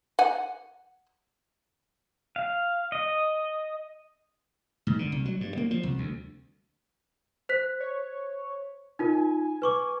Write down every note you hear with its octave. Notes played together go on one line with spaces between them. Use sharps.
F#5 G#5
F5
D#5
G#2
D3
C2
F#3
G2
A#3
F3
C2
D2
C5 F#6 B6
C#5
D#4 F4 A#4 G#5
B4 C#6 D6